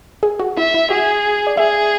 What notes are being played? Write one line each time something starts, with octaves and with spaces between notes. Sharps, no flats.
G#4
F#4
E4 E5
E4
F#4 G#4
D5
G#4 E5